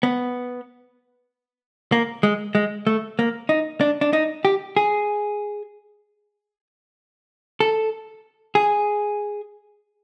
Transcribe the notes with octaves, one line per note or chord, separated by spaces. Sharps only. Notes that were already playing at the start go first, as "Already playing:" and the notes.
B3
A#3
G#3
G#3
A3
A#3
D#4
D4
D4
D#4
G4
G#4
A4
G#4